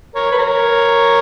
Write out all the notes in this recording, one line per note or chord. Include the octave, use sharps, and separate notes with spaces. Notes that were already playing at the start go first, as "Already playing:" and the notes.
A#4 C#5
B4
A#4 C#5